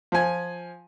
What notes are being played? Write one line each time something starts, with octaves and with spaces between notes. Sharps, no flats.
F3 G#5